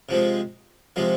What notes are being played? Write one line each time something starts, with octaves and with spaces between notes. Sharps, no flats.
C3 F3 G#3
C3 F3 G#3